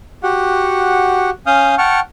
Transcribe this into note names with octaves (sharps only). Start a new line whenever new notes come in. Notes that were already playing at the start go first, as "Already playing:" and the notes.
F#4 G4 F#5
C#4 F5 D#6 F6 G6
F#5 G5 A5 C#6 F6